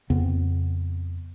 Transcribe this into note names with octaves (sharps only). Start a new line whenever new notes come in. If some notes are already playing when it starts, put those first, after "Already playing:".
F2 C#3 B3 C4